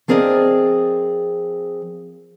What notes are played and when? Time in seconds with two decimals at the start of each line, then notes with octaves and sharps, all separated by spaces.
0.08 F3 C4 G#4 A#4 D5 D#5